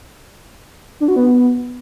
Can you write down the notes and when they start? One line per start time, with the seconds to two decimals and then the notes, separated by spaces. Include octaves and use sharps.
1.00 D4
1.08 F#4
1.16 B3